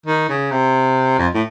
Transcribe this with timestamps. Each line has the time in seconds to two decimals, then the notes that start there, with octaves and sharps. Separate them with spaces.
0.06 D#3
0.29 C#3
0.51 C3
1.19 F2
1.34 A2